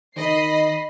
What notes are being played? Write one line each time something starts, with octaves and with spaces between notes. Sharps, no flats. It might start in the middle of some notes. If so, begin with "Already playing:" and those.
D#3 D#5 B5 C7